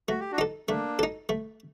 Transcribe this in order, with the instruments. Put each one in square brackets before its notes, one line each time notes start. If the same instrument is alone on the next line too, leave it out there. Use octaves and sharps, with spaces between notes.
[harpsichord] A3 [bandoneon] F#4
[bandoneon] G4
D4 F#4
[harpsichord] D#4 A4
[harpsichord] A3 [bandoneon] A#3 D4
[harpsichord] D#4 A4
A3